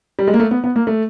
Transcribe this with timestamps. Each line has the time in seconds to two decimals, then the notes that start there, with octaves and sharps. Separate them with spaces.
0.19 G3
0.28 G#3
0.34 A#3
0.40 A3
0.51 B3
0.64 B3
0.76 A#3
0.87 A3